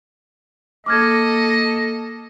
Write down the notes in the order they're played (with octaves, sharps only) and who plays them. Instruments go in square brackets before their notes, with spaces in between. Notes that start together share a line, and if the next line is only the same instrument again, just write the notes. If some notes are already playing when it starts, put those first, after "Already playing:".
[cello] A#3 A4 [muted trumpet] D#5 [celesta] D6 F6 G#6